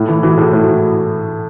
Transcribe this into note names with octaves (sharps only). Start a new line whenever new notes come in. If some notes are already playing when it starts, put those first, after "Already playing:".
Already playing: A2 E4
E3
E3 F#4
A2 G#4
A2 E4
F#4